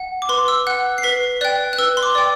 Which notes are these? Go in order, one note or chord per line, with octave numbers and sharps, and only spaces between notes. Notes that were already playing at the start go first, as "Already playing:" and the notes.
Already playing: F#5
D6
B4 C6
E6
F#5 F#6
C7
B4 B6
D5 G5 F#6
F#6
B4 E6
C6
D6
D5 G5